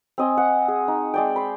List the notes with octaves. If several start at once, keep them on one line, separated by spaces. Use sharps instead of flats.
C4 D#5 G#5
F#5
G#4
D#4
G#3 D5 G5
B5 C6